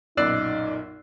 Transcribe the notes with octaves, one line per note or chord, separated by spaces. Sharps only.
B1 F#2 A#2 D#4 D5 E6 F#6 C7